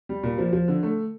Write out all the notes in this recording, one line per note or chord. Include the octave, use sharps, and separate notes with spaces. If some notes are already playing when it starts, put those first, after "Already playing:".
G3
A#2
F3
F3
D3
A3